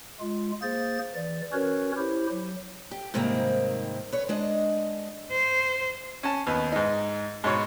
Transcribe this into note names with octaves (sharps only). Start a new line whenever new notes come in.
G#3 F4
A#3 G#4 C5 A6
E3 D5
C#4 F#4 A#4 B4 C#5
E4 G4 C5
F#3
G4
G#2 C3 D#3 G3 A#3 C4
B4 C#5
G#3 D4 D#5
C5
C#4 A5
D#2 B3
G#2 D#4
G#2 B2 C#5